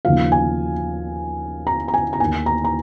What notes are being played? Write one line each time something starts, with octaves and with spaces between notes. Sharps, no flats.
D#2 C#3 F3 F5
G#5
A#5
A#5
G#5
A#5
D#2 D#3 A#3 G#5
A#5
A#5